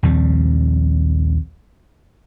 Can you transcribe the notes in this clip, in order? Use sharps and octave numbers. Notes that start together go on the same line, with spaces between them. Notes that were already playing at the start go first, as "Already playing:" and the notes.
A#1 D#2 G3 C4